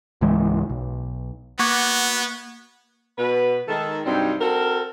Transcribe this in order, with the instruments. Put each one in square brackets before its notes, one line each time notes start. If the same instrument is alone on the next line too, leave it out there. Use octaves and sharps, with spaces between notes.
[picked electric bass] C#2 G#2 E3 G#3
B1
[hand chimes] A#3 C#6 G#6 [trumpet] B3 [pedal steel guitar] F#4 F#5 D6
[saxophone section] B2 B4
D#3 G#3 A4
G2 C3 F#3 G3 C4 D#4
C4 F#4 A4 A#4